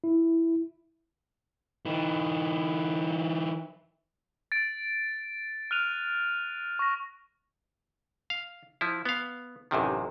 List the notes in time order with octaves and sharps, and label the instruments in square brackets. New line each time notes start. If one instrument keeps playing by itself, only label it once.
[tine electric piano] E4
[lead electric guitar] E3 D#4
[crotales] A6 D7
F6 F#6 D#7 F7
C#6 A#6
[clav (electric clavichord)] F5
F3 E4
B3 F5
A1 F#2 C3 D#3